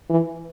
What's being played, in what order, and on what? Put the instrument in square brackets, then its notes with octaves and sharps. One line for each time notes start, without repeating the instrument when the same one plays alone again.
[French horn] E3